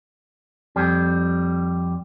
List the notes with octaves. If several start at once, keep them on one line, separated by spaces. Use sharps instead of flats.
F2 G3